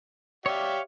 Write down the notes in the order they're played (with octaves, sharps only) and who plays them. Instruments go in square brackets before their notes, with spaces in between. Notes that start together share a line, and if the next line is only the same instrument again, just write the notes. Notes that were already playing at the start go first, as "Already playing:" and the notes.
[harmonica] G4 D5 E5 [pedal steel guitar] C#5 F5